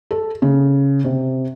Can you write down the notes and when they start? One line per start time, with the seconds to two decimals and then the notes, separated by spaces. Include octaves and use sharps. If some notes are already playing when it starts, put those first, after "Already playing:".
0.11 A4
0.42 C#3
1.04 C3